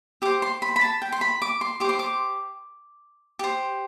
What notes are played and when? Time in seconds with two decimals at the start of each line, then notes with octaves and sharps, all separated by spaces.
0.22 G4 C5 D6
0.42 C6
0.62 B5
0.76 B5
0.81 A5
1.02 G5
1.12 C6
1.21 B5
1.42 D6
1.61 C6
1.80 G4 D6
1.84 C5 C6
1.99 D6
3.39 G4 C5